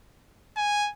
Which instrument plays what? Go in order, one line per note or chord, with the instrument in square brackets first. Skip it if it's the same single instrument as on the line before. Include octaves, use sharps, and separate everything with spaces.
[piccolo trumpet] G#5